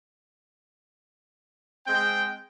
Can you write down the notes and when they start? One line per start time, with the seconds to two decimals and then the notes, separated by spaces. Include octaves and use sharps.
1.87 G#3 C4 G5